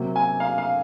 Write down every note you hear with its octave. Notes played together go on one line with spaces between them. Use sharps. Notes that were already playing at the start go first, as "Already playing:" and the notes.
Already playing: C3 F#3 A#3
G#5
F5
F5